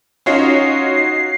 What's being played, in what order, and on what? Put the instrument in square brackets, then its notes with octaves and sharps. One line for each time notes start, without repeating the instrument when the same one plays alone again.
[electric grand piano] C#4 F4 C#5 [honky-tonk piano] D#4 F#4 [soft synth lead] C7